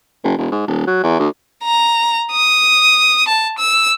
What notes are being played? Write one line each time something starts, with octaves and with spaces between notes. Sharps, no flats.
F#1
E1
G#2
D#1
F#3
E2
D2
A#5
D#6
A5
E6